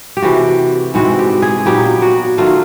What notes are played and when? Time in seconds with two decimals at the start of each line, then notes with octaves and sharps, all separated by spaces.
0.17 G4
0.22 C3 E3 A3 F#4
0.94 G#2 E3 G#3 C4 F#4
1.19 G4
1.42 G#4
1.65 A#2 F#3 B3 D#4 G4
2.02 F#4
2.38 D#3 F#3 A3 F4